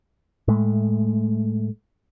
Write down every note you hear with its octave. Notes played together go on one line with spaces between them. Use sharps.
A2 G#3 A3